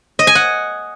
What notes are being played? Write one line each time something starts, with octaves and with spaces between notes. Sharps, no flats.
D#5
G#5
F#5